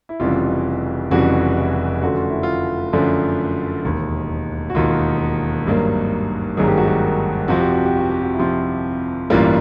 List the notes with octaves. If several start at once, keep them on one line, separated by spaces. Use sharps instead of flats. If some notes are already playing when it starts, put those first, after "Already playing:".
E4
F1 F2 C#3 E3 G3 F4
F1 F2 C#3 E3 G3 F#4
E4
F#2 D3 F3 A3 F#4
F4
E4
F4
F#2 D3 F3 A3
E1 D#2 D#3
F#4
E1 D#2 D#3 F4
G#1 G2 D#3 F#3 A#3
G#1 G2 D#3 F#3 A#3 G#4
G4
F#4
G4
F2 C3 F3 F#4
G4
F#4
G4
F#4
G4
F#4
E4
F2 C3 F3 F4
A1 G2 E3 G3 A#3 F4